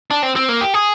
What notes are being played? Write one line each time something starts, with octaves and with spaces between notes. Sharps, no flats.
D4
C4
C4
A#3
G4
G#4